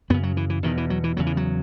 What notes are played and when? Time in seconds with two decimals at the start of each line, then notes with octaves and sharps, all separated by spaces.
0.10 F#2 C#3 B3
0.23 F#3
0.37 E3
0.50 E3
0.63 E2 B2 D#3
0.77 E3
0.90 F#3
1.04 E3
1.17 E2 C#3 F#3
1.26 E3
1.37 F#3